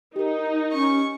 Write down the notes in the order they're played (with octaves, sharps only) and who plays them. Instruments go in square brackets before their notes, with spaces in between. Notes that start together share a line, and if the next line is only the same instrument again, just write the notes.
[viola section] D#4 [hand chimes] G4 A#4
[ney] C#4 [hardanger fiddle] C#6